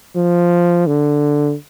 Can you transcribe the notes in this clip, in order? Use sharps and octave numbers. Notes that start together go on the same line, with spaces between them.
F3
D3